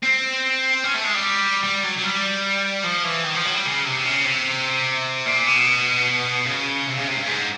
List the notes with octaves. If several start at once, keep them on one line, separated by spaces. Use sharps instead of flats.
C4
C#4
A3
G#3
G3
G3
F#3
F#3
G3
F3
E3
D#3
F3
F#3
G3
C#3
C3
C#3
C3
A#2
B2
C#3
C3
C#3
C3
G2
G#2